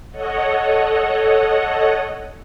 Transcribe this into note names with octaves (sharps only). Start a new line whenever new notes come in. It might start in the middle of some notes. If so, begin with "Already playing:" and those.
A4 C#5 D#5 F#5